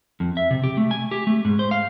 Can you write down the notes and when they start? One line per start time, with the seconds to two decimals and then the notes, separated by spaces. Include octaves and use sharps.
0.20 F2
0.37 E5
0.51 C3
0.64 G4
0.77 A3
0.91 G#5
1.11 G4
1.27 A3
1.45 G#2
1.59 C5
1.71 F5